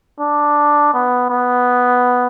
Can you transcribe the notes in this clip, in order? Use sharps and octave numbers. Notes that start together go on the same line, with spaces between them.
D4
B3
B3